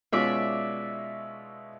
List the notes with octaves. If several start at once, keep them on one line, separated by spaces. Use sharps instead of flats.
B2 G#3 C#4 F4 D5 E5